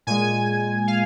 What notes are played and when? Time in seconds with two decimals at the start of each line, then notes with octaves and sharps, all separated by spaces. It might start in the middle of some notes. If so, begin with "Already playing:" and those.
0.07 A#2 G#3 G#5
0.87 F5